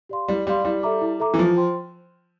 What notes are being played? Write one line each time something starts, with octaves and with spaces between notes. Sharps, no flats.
G4 D5 F5 C6
G3 E4
G3 G4 D5 F5 C6
G3 E4
A4 E5 A#5 D6
E4
A4 E5 A#5 D6
E3
F3 F4
C5 G5 C6